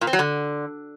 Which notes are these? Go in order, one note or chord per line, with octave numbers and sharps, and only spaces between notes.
A#2
C4
F#3
D3